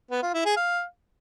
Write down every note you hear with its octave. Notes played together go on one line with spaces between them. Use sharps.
B3
F4
E4
G#4
F5